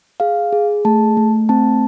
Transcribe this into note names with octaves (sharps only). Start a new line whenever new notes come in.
G#4 F5
G#4
A3 A5
A3
C4 A5